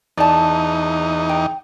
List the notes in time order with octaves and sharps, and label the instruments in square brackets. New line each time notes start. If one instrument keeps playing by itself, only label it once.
[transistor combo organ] E2 D#4 [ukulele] D5 A5
[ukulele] G5